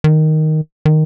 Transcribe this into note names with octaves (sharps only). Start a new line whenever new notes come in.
D#3
D#3